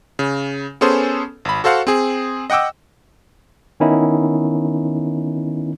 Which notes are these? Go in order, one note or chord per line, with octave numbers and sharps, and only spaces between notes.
C#3
B3 C#4 G#4 A4 C5
G#1 B5
F#4 A4 C5 F5 F#5
C4 G#4
D#5 F#5 G5 D6 E6
D#3 B3 C#4 D#4 E4